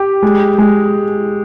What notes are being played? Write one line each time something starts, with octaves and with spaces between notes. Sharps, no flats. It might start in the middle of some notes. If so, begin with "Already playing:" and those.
Already playing: G4
G#3
G#3